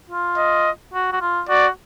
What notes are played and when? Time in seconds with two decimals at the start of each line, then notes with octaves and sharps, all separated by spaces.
0.10 F4
0.37 D#5
0.94 F#4
1.13 F#4
1.21 F4
1.49 F#4 D5